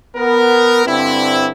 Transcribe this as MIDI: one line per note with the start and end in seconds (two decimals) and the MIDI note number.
0.16 0.85 59
0.16 0.85 70
0.86 1.49 43
0.86 1.49 50
0.86 1.49 60
0.86 1.49 64